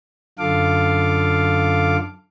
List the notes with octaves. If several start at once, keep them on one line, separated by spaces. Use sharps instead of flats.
F#2 D3 F4 A4 F5 D6